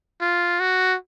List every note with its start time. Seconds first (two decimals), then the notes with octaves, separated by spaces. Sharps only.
0.21 F4
0.60 F#4